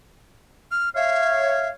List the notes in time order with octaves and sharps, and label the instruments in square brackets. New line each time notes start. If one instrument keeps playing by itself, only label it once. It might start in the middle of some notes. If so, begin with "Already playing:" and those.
[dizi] F6
[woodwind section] C#5 F5 [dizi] E5